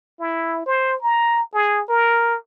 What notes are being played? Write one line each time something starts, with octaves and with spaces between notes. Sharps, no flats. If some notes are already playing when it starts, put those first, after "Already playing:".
E4
C5
A#5
G#4
A#4